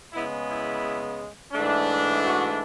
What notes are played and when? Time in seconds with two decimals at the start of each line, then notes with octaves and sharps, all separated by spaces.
0.12 C#3 G#3 B3 E4
0.48 E4
1.53 G#2 E3 A3 D4
2.23 F#4